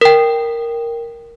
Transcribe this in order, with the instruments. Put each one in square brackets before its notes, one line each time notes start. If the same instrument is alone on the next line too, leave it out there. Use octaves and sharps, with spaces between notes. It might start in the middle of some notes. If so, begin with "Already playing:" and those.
[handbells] A#4 G5